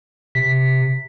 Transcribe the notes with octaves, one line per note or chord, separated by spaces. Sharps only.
C3 B6